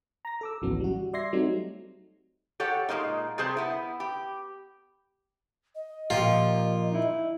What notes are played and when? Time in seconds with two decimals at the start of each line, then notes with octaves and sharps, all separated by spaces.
0.25 A#5 A#6
0.41 A4 D6 E6
0.62 G#1 C#2 E3 F#3 B3 C#4
0.80 G3 F#4
1.13 D5 E5 C6 G#6 A#6 C7
1.33 F#3 G3 A3 C4 D#4
2.60 G4 A4 C#5 F#5
2.89 A#2 E3 G#3 A#3 D#4
3.38 C3 G3 G#4 C5 A5
3.57 B3 E4
4.00 G4
5.75 D#5
6.10 A#2 F3 F4 G4
6.92 D#4 E4